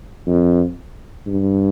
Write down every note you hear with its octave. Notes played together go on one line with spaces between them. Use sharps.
F2
G2